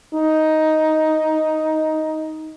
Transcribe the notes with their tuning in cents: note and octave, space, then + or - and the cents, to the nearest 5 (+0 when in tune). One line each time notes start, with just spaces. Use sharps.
D#4 +10